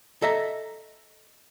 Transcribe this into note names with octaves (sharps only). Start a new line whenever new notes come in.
A4 D#5 E5 A#5